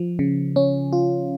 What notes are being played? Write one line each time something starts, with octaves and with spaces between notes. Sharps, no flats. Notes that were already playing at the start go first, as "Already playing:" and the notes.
Already playing: F3
C#3
C#4
F4